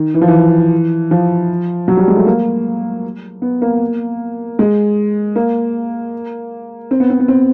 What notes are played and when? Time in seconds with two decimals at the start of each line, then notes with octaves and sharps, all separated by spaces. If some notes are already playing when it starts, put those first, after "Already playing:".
Already playing: D#3
0.14 E3
0.21 F3
0.28 E3
1.11 F3
1.88 F#3
1.97 G3
2.08 G#3
2.17 A3
2.26 A#3
3.42 B3
3.62 A#3
4.59 G#3
5.36 A#3
6.91 C4
7.00 B3
7.10 C4
7.20 B3
7.28 C4